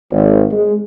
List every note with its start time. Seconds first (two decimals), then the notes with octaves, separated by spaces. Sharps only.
0.12 G#1
0.51 G#3